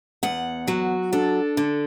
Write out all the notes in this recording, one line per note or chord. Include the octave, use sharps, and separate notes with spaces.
E2 F#5
F#3 F#4
D4 A4
D3